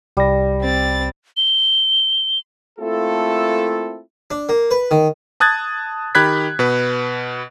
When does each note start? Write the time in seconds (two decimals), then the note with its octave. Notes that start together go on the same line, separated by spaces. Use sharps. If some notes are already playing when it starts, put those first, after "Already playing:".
0.17 C2 G3 A#6
0.61 C4 A6
1.37 G7
2.79 A3 A#3 C4 E4 F4 A4
4.31 D4
4.49 A#3
4.71 B4
4.91 D#3
5.40 A5 D#6 F#6 G#6 A6
6.15 D#3 G4 B5 F#6 G#6 B6
6.59 B2 B4